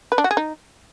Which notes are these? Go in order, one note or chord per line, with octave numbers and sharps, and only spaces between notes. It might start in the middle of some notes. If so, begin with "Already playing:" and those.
B4
D4
F#4
G#4
D#4